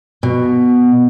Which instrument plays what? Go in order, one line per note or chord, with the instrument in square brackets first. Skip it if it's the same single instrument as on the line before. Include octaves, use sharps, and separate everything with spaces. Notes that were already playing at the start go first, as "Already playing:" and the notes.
[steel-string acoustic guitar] B2